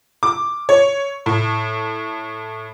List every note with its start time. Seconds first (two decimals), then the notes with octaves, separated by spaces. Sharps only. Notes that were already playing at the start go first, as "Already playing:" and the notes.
0.23 D6
0.69 C#5
1.26 A2